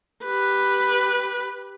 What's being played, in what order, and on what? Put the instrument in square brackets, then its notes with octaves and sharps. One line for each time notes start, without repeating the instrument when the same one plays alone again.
[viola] G4 B4